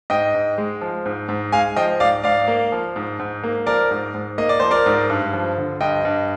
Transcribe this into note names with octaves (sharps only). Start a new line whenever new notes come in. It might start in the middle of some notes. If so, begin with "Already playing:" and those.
G#2 D#5 G5
G#2
G#3
F3
G#2
G#2
G#3 F5 G#5
F3 D#5 G5
G#2 D5 F5
G#2 D5 F5
A#3
F3
G#2
G#2
A#3
F3 A#4 D5
G#2
G#2
A#3 D#5
D5
F3 C5
A#4 D5
G#2
G2
F3
D3
G2 D#5 G5
G2